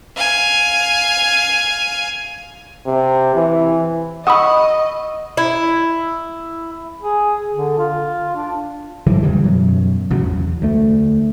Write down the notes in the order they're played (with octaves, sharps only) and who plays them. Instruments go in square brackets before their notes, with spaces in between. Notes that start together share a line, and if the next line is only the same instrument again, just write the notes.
[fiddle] F5 G#5
[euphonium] C3
E3
[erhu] D#5 [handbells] F#5 B5 [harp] C#6 D#6 E6
[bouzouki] E4
[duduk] G#4
D3
F4
D4
[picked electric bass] G2 D3 E3 F#3
E2 C#3 E3 G3
F#2 B2 F#3
A1 C#3 F#3
E2
D2 A3